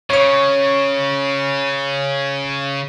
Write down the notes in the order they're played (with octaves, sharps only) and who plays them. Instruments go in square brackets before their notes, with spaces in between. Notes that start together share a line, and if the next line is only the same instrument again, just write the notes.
[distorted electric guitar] C#3 [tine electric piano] C#5 C#6